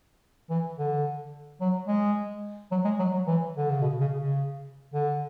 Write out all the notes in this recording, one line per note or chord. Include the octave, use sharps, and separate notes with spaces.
E3
D3
F#3
G#3
F#3
G#3
F#3
F#3
E3
D3
C#3
B2
C#3
C#3
D3